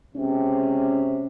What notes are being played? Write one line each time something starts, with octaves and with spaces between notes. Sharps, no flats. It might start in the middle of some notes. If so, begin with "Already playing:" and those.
C#2 C3 C#4